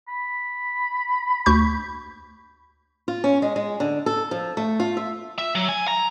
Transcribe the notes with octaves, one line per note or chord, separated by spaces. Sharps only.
B5
D2 C#6 G6
F4
C#4
G#3
G#3
D3
A4
F3
A3
F4
E5
E5
F#3
G#5
A#5